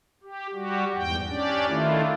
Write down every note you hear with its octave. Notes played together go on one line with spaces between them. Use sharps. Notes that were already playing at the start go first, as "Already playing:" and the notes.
G4
G3 F#4 G4
E2 G#2 G5
C#4 D4 G4 D5
D#3 A3 D4 E4 F4